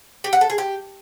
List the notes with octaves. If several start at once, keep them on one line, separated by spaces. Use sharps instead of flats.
G4
F#5
A4
G#4
G4